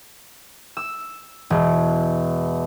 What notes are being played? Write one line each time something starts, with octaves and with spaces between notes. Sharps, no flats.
E6
E1